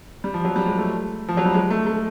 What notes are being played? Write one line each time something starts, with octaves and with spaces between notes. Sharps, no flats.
G3
F3
F#3
G3
G#3
A3
F3
F#3
G3
G#3
A3
A3